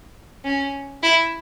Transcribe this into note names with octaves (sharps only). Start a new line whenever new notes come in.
C#4
E4